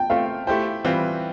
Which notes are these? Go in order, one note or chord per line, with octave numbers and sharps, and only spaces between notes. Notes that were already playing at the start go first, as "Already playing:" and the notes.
Already playing: G5 A5
A3 C4 F4 F5
A3 E4 G4 C5 G5
E3 G3 C4 F4 B4